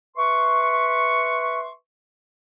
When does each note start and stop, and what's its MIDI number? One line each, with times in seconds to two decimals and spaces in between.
0.16 1.70 71
0.16 1.70 76
0.16 1.70 84
0.16 1.70 85